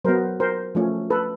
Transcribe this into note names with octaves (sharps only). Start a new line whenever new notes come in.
F#3 B3 A#4 C5
A#4 C5
F3 A3 C#4
A4 B4